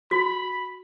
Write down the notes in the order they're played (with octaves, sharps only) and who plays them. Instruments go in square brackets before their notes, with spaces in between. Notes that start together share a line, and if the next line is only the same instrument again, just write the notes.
[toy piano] F#4 [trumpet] B5